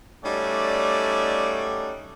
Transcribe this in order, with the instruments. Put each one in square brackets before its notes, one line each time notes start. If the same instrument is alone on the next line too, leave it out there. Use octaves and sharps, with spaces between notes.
[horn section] G3 A3 C#4 D#4 F#4 D5